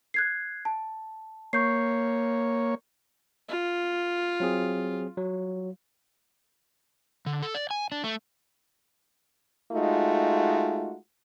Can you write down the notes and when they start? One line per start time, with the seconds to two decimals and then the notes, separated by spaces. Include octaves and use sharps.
0.14 F#6 G#6 C7
0.65 A5
1.53 A#3 C#5 C#6 G6 C7
3.49 F4
4.40 F#3 C4 G#4
5.17 F#3
7.26 D3
7.43 A4
7.55 D5
7.71 G#5
7.92 D4
8.04 A3
9.72 G#3 A3 D#4 F4 F#4